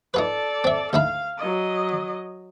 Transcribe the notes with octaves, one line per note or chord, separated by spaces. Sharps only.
D#4 F4 A4 B4 D5
C4 E5
D2 D#4 E4 F5
F#3 D#5